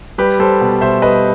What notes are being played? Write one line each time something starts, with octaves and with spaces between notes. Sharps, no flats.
G3 G4 B4
G3 A4 C5
B2
B2 C5 E5
G3 B4 D#5